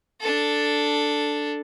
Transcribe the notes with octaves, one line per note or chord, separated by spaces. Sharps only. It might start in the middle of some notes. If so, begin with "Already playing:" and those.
D4 A4